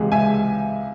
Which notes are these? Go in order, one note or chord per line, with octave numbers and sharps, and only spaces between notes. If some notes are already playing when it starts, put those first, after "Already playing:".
Already playing: C#2 C3 E3 G#3
E5 G#5